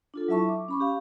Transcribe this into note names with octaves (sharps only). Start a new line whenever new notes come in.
D4 F4 A4
F#3 E4 E5 A5 C#6
D6
C#4 B5 C#6
G4 F5